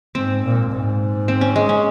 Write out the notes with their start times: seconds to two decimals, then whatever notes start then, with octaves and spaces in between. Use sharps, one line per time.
0.15 G#2 C4
0.44 A#2
0.72 G#2
1.28 C4
1.41 C#4
1.56 G#3
1.69 C#4